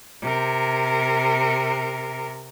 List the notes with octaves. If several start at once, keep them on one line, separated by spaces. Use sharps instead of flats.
C3 A#4